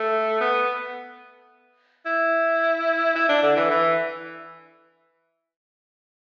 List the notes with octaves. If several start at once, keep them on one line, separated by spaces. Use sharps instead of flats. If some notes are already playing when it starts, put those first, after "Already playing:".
Already playing: A3
B3
E4
E4
D4
D3
E3
E3